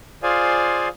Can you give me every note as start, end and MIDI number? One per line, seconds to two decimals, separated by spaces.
0.23 0.88 65
0.23 0.88 68
0.23 0.88 72
0.23 0.88 74
0.23 0.88 77
0.23 0.88 80